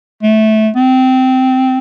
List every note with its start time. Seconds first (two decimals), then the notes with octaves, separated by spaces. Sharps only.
0.23 A3
0.76 C4